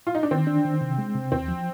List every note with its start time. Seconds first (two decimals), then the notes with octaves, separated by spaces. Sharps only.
0.07 F4
0.15 D#4
0.23 D4
0.31 D#3 C4
0.47 D4
0.65 D#3
0.81 C3
0.98 G#3
1.15 C3
1.32 D#2 C4
1.48 F3